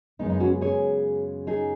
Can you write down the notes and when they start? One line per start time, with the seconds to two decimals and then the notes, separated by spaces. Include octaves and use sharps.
0.19 F#2 C#3 G#3 B3 D#4
0.30 D#4
0.40 C#4 F#4
0.61 G#4 C#5
1.47 D#4 G#4